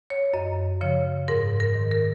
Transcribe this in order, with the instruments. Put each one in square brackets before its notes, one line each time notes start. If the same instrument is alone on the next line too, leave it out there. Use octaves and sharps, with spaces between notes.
[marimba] C#5
F#2 D#5
C#3 F3 C#5
G#2 A#4
A#4
D#3
A#4